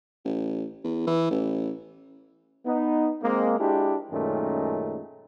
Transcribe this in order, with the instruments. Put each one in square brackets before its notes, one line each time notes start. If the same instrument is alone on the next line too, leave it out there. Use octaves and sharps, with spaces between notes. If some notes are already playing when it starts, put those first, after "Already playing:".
[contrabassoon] A1
E2
E3
A1
[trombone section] B3 D#4
G#3 A#3 C4
G#3 D4 E4 F#4 G4
F#2 A#2 D#3 G#3 A3 C#4